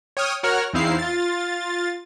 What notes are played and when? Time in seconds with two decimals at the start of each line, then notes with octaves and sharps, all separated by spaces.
0.17 C#5 G5 D#6 F6
0.43 F#4 A#4 C#5 F#5 F6
0.73 E2 C4 D#4 E4 F5 C7
0.99 F4 A6